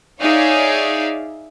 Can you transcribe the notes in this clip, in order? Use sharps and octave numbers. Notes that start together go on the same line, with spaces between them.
D#4 G#4 C#5 D5 E5 F5